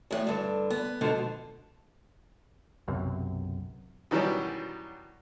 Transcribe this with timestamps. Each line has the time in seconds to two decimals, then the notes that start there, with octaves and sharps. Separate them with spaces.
0.11 E2 A2
0.27 G2 D3
0.70 B3
1.01 G#2 B2 D3 F3
2.88 B1 F#2 C3
4.11 B2 D#3 E3 F#3 G3 C#4